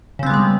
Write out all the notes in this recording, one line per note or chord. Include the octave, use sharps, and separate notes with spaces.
C#3 G3 G#3 B3 C4